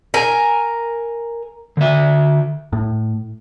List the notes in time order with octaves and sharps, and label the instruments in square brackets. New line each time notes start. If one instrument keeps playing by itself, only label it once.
[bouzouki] A#4 G#5
[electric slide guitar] D3 E5
[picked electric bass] A2